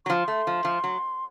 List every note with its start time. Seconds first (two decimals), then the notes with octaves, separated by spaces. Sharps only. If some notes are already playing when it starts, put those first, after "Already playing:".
0.05 F#3 C#6
0.09 F3 C6
0.28 A3
0.47 F3
0.65 F3
0.84 F#3